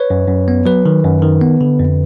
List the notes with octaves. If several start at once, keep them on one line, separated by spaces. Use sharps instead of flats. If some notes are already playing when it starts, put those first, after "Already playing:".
Already playing: B4 C#5
F#2
F#2
B3
F#3 B4
D#3
F#2
D#3
B3
D3
F2